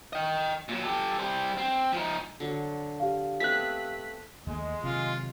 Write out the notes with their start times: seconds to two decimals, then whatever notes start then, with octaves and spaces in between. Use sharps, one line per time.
0.13 D#5 G5
0.69 A#2 F#3
0.83 G4 A4
1.19 G3 C5
1.57 C4
1.93 F3 D#4
2.40 D3 F#3
3.00 G4 F5
3.40 A3 B3 C4 F#6 B6
4.47 D#2 G#3 A3
4.83 C3 D#3 F#3 F4